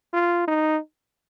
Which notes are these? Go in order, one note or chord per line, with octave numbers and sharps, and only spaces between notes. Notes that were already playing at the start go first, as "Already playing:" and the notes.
F4
D#4